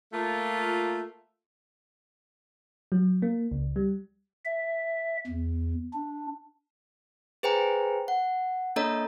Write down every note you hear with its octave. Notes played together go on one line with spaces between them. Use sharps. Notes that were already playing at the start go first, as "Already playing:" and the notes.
A3 A#3 F4
F#3
A#3
C#2
G3
E5
E2
D4
G#4 B4 C5 G5 G#5 A#5
F#5
A#3 D4 A4 C#5 D#5 A#5